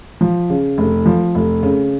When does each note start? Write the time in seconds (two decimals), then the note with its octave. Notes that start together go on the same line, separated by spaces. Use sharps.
0.21 F3
0.50 C#3
0.78 F1
1.06 F3
1.35 F1
1.63 C#3